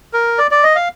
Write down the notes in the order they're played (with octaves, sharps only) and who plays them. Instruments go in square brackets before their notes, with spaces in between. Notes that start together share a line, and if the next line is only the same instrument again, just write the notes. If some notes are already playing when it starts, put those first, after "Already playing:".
[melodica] A#4
D5
D5
D#5
F5